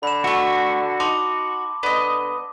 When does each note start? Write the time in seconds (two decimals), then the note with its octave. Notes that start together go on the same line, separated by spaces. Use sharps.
0.03 D3 B5 E7
0.24 A3 F#4 E5
1.00 D#4 A5 C6 D6
1.83 D3 B3 D#5